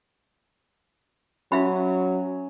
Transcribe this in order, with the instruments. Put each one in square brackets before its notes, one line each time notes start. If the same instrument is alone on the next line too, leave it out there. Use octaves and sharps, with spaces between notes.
[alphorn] F#3 [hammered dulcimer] C#4 [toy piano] F#4 E5 B5